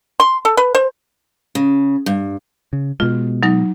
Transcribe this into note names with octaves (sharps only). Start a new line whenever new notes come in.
C6
A4
B4
C5
C#3
G2
C#3
B2 G#3 F4
F#3 D#4 A#6